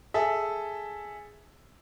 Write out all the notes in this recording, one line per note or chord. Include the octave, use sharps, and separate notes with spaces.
G#4 A4 E5